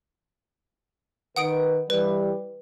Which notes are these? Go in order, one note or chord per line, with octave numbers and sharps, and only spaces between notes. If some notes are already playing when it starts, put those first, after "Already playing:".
D#3 B4 F#5 D#6 D7
E3 G3 B4